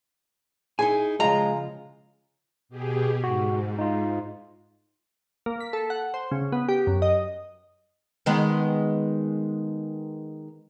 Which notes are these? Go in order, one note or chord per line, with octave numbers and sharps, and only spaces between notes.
D#4 E4 G#4 G#5
C#3 F3 G#3 F4 A#5
B2 G4 G#4
G#2 F#4
D#4 F4
A#3
B6
A4
F#5
C5
C#3
B3
G4
F#2
D#5
D#3 G#3 B3